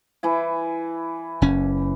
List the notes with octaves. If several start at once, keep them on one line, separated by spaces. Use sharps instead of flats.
E3 E4 G#5
F#1 C#4